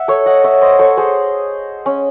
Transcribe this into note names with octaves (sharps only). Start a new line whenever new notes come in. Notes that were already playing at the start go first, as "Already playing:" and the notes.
Already playing: E5 F#5
A4 C#5
D#5 F#5
C#5 E5
C5 D#5
A4 C#5
G#4 C5
C#4